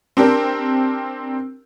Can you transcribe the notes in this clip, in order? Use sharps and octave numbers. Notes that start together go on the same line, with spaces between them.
C4 D4 G4 A#4